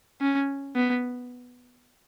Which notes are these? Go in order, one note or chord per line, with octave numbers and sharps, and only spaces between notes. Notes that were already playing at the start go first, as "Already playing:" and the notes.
C#4
B3